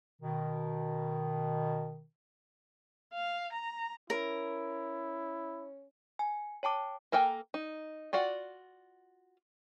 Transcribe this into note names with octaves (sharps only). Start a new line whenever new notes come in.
B2 D#3
F5
A#5
C#4 E4 A#4
G#5
C#5 G5 A5 D6
A#3 A4 A#4 G5 G#5
D#4
F4 F#4 D5 F#5